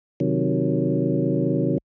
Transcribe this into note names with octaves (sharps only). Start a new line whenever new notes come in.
C3 D#3 F#3